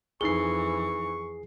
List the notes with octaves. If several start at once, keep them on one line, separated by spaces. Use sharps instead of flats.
F2 E3 D#4 G#4 C#6 C7 G7